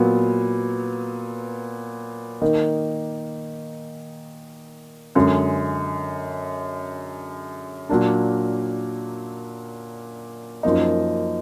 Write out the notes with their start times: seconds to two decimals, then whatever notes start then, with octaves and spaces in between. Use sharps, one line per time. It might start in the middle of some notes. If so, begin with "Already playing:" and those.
Already playing: A#2 F#3 B3
2.42 D#3 A#3 D#4
5.15 F#2 D3 G#3
7.90 A#2 F#3 A#3 D4
10.63 F#2 F3 A#3 D#4